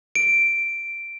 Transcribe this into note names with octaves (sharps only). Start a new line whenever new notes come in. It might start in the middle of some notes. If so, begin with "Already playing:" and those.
D7